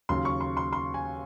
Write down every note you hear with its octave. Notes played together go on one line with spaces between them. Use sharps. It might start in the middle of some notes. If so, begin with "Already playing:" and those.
D#2 C#3 F#3 C6
C#6
C6
C6
C6
G#5